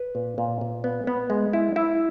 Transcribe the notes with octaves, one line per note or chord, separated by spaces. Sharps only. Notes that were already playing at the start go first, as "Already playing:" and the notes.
Already playing: B4
A#2
A#2
A#2
B3
B3
G#3
E4
E4